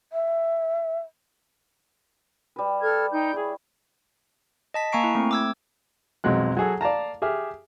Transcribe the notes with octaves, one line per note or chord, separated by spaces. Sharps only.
E5
G3 B4
A4 F6 G#6
D#4 G5 G6
E4 G#4 C#5
D#5 A5 B6
A#3 G#5 A#5 C#6 C7 D7
E4
A3 C4
D6 E6 G#6
B1 F2 F#3 G#3 F#6
F#3 F#4 G#4 A4
D5 F5 A5 A#5
G4 G#4 E5 F6